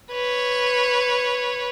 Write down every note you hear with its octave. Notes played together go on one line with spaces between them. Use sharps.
B4 C#5